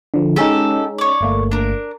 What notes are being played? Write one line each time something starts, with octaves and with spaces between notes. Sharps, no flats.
D3 F3
G#3 C#4 D#4 G4 A4
C#5 D5
G1 A3 A#3
D4 A#4